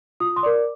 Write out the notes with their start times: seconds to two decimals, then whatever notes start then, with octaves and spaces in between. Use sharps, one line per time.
0.20 F4 D#6
0.36 C6
0.43 A#4 D5 D6